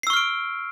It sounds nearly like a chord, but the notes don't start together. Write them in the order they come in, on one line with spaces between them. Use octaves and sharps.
C7 E6 C#6 F6 D7